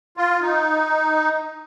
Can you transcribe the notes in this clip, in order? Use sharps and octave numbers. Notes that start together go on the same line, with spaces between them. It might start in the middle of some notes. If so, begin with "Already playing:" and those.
F4
D#4